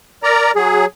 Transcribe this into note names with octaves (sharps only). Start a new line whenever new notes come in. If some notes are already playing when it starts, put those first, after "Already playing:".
A#4 D5 A#5
F#3 G#4